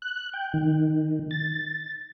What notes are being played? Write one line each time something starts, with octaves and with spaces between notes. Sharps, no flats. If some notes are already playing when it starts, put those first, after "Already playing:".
F#6
G5
D#3
A6